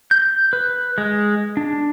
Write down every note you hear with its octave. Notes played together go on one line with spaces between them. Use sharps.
G6
B4
G#3
D4